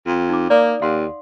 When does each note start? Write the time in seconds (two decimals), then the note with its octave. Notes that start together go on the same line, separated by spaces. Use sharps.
0.06 F2
0.29 D#4 D6
0.50 A#3 D5 D6 D#6
0.82 D#2 F5 F#5 C6